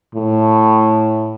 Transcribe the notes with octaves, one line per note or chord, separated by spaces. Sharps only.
A2